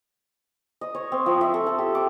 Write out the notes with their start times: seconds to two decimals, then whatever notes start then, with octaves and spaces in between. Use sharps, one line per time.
0.81 D#5
0.95 C#5
1.12 C4
1.26 F3
1.41 E5
1.54 A4
1.67 A4
1.78 G4
1.95 D6